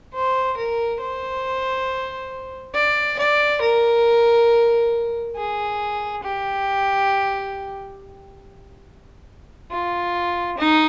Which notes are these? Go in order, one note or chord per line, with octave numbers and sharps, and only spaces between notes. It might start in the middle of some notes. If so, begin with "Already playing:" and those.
C5
A#4
C5
D5
D5
A#4
G#4
G4
F4
D#4